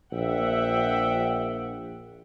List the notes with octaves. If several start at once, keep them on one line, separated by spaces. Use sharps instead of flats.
A#1 E5 F#5 G5